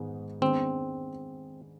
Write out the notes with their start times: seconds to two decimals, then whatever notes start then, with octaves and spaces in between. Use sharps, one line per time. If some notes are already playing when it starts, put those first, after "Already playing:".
Already playing: G#2 D#3 G#3 B3
0.41 D#3 G#3 B3 C4 D4